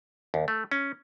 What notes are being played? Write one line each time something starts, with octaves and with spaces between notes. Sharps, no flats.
D#2
A3
C#4